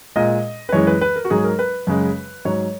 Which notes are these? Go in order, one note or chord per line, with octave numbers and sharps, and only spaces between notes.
A#2 G#3 D#5
B4
F#2 E3 G#3 C#5
B4
B4
A#4
F#4
G#2 F#3 G#4
A#4
B4
F#2 C#3 G#3
G#2 F#3 C#5